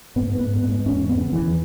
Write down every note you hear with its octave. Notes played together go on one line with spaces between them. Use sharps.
G#2 B3
G#2
B3
G#2
B3
G#2
E2 C#4
E2
B3
C#3
E3
E2